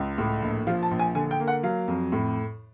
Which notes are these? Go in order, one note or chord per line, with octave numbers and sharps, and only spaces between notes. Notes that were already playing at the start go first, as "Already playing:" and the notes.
Already playing: C#2
A2
A#1
F3 F5
A5
A#1
G#5
D3 G#5
G5
A#3
F#5
F#3 F5
F2
A2